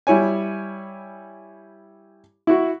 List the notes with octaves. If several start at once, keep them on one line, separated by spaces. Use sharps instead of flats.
G3 E4 C#5 G#5
E4 F#4